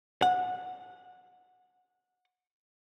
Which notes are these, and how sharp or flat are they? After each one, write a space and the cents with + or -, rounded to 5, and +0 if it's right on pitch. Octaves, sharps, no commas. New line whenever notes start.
F#5 -20